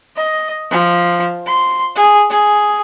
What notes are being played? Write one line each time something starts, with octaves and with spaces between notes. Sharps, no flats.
D#5
F3
C6
G#4
G#4